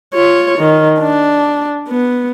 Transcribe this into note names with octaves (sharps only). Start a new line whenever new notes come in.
F4 C#5
D#3
D4
B3